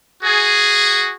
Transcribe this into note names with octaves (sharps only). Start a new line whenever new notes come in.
F#4 G#4